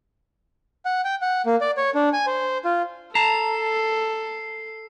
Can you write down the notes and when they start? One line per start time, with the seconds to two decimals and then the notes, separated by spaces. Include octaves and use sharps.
0.85 F#5
1.05 G5
1.22 F#5
1.46 A#3
1.61 D5
1.77 C#5
1.95 D4
2.13 G#5
2.27 C5
2.65 F4
3.15 A4 A5 A#5 C7